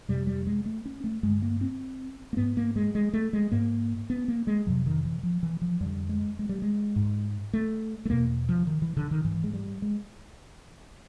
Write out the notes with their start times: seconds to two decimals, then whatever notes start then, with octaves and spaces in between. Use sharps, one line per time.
0.08 F2 C3 G3
0.27 G3
0.47 G#3
0.66 A3
0.86 C#4
1.04 A3
1.23 G2 D3 G#3
1.42 A#3
1.61 C4
2.33 A#3
2.37 G#2 B3
2.57 A#3
2.76 G#3
2.95 G#3
3.13 A3
3.33 G#3
3.52 G#2 A#3
4.10 B3
4.28 A#3
4.47 G#3
4.67 F2 C3 F#3
4.86 D#3
5.05 E3
5.23 F3
5.43 E3
5.62 F3
5.81 F2 D3 G3
6.09 G#3
6.39 G#3
6.49 G3
6.62 G#3
6.96 G#2
7.53 A3
8.05 A3
8.10 E2 B2 A#3
8.49 F3
8.67 D#3
8.82 E3
8.97 D3
9.11 D#3
9.24 G#2 E3
9.44 G#3
9.53 G3
9.82 G#3